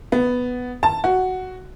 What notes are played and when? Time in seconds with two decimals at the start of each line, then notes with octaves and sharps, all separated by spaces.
0.12 B3
0.83 A5
1.04 F#4